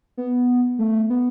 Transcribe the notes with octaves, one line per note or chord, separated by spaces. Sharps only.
B3
A3
B3